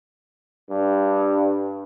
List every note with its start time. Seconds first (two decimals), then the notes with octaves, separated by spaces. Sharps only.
0.69 G2